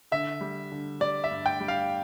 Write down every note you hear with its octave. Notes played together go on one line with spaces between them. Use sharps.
D3 E5
G3
D3
G3 D5
E5
G2
G5
G3
F5